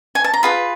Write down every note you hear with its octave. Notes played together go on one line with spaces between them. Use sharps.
G#5
A5
A#5
F4 G#4 B4 B5